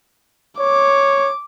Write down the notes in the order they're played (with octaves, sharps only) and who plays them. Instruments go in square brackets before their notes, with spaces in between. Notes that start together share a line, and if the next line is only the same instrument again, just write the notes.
[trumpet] C#5 [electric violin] D6